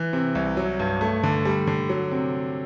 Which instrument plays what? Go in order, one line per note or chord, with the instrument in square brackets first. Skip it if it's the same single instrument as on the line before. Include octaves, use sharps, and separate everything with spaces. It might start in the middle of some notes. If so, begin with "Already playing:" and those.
Already playing: [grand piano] E3
C3
C2
F#3
G2
A3
D3
G3
D3
F#3
C3